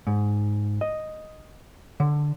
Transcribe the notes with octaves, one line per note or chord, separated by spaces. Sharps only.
G#2
D#5
D3